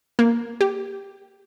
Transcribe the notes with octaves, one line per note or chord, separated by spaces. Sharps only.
A#3
G4